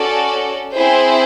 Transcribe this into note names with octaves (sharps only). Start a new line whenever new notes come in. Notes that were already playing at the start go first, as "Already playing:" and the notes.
Already playing: C#4 F#4 A4 D5
C4 E4 G#4 C5